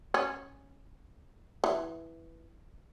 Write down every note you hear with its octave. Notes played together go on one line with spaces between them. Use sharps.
C#4
E3